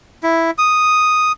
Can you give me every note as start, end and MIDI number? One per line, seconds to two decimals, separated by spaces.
0.23 0.51 64
0.58 1.32 87